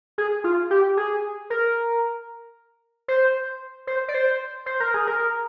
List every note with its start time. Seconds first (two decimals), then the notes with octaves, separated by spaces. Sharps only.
0.18 G#4
0.44 F4
0.71 G4
0.97 G#4
1.50 A#4
3.08 C5
3.87 C5
4.08 D5
4.14 C5
4.66 C5
4.80 A#4
4.94 G#4
5.07 A#4